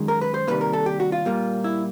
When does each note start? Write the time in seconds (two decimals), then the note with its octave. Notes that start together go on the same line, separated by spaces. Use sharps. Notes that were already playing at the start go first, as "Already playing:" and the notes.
Already playing: F#2 D#3 G#3
0.08 A#4
0.21 B4
0.34 C5
0.47 C3 D#3 G3 A#3 B4
0.61 A#4
0.73 A4
0.86 G4
1.00 F#4
1.12 F4
1.25 A#2 G3 A#3
1.64 E4